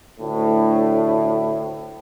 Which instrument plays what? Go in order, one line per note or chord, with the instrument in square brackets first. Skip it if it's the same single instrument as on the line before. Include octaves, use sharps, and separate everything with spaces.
[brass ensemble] D2 A2